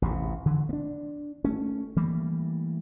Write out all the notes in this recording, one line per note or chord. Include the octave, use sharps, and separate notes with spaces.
A1 E2 C3
D3 E3
A#3 D4
A3 C#4
E3 G3 A3 A#3